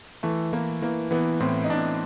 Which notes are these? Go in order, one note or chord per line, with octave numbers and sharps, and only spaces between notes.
E3 A3
E3 A#3
E3 A#3
E3 B3
A2 C4
D#4
A2 D4